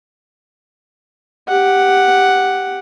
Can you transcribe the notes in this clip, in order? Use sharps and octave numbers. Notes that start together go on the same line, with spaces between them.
G4 F#5